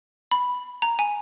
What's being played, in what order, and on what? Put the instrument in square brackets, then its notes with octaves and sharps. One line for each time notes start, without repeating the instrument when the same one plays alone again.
[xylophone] B5
A#5
G#5